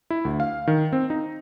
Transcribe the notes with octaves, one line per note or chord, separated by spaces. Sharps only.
E4
D2
F5
D#3
C4
D#4